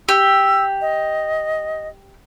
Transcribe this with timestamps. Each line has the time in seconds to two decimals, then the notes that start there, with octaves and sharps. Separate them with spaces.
0.09 G4 E6
0.81 D#5